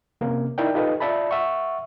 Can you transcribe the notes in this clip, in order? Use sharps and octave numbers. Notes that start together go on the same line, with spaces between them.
C3 A#3 C#4
D#4 E4 A#4 D5 G5
D#4 F4 G4 A4 B4 D#5
F4 D5 E5 A5 B5
E5 F#5 C#6